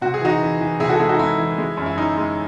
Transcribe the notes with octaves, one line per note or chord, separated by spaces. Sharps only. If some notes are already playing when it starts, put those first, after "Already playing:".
C3 F#4
G#4
E3 D#4 F#4
E3
E3
C3 E4 G#4
F#4 A4
G#3 E4 G#4
D#4 F#4
G#3 E4
E3
G#3
F#2
E4
F#2 D#4
G#3